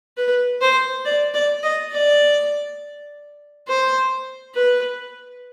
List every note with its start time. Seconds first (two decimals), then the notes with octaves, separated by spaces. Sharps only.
0.17 B4
0.61 C5
1.05 D5
1.34 D5
1.63 D#5
1.93 D5
3.68 C5
4.55 B4